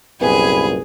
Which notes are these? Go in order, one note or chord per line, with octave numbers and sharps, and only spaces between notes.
C2 F#2 A#2 B3 G#4 G#5 B5